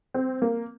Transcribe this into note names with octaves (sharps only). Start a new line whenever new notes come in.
C4
A#3